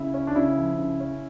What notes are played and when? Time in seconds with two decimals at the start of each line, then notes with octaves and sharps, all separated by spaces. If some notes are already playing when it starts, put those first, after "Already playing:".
Already playing: C#3 E4
0.14 C#4
0.27 D4
0.36 C#3 E4
0.57 F3
0.78 C#3
1.00 C#4